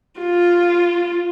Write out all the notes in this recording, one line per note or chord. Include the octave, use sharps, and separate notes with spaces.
F4